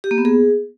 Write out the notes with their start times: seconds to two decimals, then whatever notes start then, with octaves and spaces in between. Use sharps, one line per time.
0.04 G4
0.11 A#3
0.18 B3
0.25 G#4